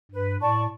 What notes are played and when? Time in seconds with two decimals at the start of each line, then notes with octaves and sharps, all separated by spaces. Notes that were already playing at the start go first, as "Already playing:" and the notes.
0.12 G2 B4
0.40 A2 D5 A5 C#6